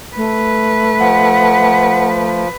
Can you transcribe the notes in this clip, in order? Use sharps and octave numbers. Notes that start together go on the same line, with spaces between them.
A3 B4
F3 F#5